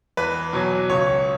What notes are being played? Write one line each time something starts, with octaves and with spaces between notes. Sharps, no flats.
E2 B4
B2 F#3
C#2 C#5